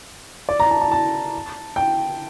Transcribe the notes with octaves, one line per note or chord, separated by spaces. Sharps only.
D5
A#5
A5
A5
A5
G5